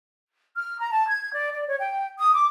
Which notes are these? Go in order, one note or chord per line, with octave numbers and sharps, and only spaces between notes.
F6
A#5
A5
G#6
D5
D5
C#5
G5
D#6
D6